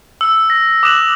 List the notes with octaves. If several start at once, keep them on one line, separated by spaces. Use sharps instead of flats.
E6
A#6
D6 D#6 F#6 E7 F#7